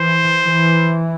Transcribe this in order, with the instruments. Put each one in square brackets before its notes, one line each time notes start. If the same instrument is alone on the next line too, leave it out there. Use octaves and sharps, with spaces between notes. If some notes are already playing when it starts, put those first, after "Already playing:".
Already playing: [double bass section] E3 [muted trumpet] C5
[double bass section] E3